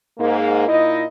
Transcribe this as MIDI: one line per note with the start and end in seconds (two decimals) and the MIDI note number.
0.18 0.66 44
0.18 0.66 58
0.68 1.03 46
0.68 1.03 63
0.68 1.03 64
0.68 1.03 75